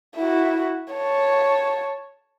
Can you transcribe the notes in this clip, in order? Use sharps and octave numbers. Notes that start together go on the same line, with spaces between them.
E4 F#4
C#5 A5